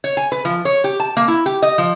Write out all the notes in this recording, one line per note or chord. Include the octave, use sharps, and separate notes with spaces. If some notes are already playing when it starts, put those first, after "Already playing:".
C#5
G#5
B4
F3
C#5
G4
A5
A#3
E4
G4
D#5
F3